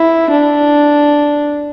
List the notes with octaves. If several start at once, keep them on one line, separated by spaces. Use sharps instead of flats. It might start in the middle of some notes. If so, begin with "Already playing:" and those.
Already playing: E4
D4